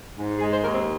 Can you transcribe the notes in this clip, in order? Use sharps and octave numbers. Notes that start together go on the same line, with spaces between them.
G#2
G#3 G#4
C5
D#2 A#4
C4